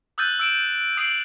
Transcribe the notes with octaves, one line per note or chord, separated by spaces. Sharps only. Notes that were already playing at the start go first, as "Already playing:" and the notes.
D#6 E6 F#6 G6 A6 D#7
E6 D7 E7
D#6 C7 D7 F#7